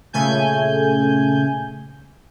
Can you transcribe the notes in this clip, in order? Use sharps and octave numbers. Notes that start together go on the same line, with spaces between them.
A#2 C#3 A3 G#5 G6